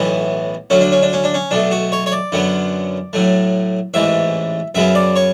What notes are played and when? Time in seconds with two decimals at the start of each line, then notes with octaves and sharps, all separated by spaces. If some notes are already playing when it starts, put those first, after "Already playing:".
Already playing: B1 A2 E3 B3
0.70 D2 D3 F#3 C#4
0.81 D4
0.92 C#4
1.02 D4
1.13 C#4
1.24 D4
1.34 C#4
1.51 B1 B2 A3 D4
1.71 F#4
1.92 C#5
2.06 C#5
2.12 D5
2.32 F#2 D3 F#3 B3
3.13 A2 F#3 A3
3.94 A1 G#2 E3 E5
4.75 F#2 C#3 F#3 B3 E5
4.95 D5
5.16 C#5